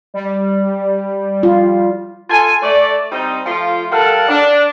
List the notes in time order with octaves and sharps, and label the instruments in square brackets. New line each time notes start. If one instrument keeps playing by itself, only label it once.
[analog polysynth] G3
[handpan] F4
[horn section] F4 A4 G#5
A3 D5
G3 C4 D#4
F3 A3 F4
G3 A4 A#4 F5 F#5
D4